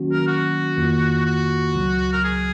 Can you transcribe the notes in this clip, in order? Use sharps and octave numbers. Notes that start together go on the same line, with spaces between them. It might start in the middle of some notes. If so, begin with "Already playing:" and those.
Already playing: D#3 F#3 A#3 C#4 F#4
A#4
F#4
F2 D#3 A#3 F4
F#4
C#2 C#3 F#3
A#4
G#4